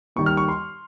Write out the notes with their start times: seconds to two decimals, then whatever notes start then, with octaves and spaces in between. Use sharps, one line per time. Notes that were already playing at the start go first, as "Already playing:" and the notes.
0.16 D#3 G3 A#3 C#6
0.26 F6
0.37 C#6
0.49 C6